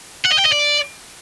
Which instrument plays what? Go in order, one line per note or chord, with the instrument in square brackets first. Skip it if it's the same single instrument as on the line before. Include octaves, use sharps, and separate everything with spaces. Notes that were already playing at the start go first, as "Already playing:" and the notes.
[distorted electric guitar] F#5
D#5
G5
D#5
D5